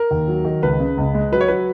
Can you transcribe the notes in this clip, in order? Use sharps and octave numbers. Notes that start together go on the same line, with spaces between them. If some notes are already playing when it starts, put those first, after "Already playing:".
Already playing: A#4
D#2
F#3
D#3
C#2 B4
C#3
C#2
G#3
F#3 B4
C#5
F#3 B4